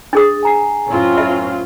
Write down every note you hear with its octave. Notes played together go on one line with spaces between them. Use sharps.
D4 G#4 D#6 A6
G#5 A#5 C7
F#2 A2 C4 C#4 E4 F4
E5